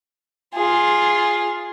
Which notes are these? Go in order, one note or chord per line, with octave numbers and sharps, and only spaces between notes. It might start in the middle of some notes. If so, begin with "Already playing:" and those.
F4 G#4